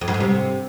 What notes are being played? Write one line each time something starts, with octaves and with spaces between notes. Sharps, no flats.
F2
F#2
G#2
C3